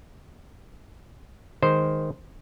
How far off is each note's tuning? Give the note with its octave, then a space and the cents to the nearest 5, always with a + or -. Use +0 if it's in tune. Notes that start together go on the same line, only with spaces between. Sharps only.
D#3 +0 G#3 +0 C5 +0